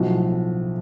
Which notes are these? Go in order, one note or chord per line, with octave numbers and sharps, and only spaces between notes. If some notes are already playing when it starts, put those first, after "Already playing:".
Already playing: B1 A2 F3 F#4